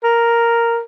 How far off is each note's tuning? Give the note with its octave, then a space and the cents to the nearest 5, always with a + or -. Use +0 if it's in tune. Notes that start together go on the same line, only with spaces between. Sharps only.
A#4 +0